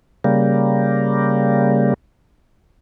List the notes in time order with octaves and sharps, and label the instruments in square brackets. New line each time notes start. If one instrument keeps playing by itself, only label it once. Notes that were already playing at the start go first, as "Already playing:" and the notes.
[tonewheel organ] C#3 G3 A#3